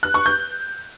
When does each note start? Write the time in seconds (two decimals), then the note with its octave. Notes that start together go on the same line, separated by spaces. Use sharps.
0.03 F#6
0.14 C#6
0.26 G6